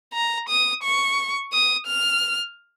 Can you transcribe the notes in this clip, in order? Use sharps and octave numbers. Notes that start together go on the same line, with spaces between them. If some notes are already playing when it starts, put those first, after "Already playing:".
A#5
D#6
C#6
D#6
F6